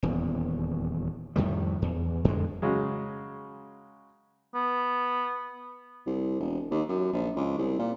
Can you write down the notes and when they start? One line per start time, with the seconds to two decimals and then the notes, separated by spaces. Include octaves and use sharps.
0.03 D#1 E2
1.36 F2 A2 D#3 G3
1.82 E2
2.25 F2 D3 G#3
2.62 C#3 F#3 G#3
4.55 B3
6.06 C2
6.40 E1
6.71 D#2
6.89 F#2
7.13 A#1
7.36 C#2
7.58 C2
7.79 A#2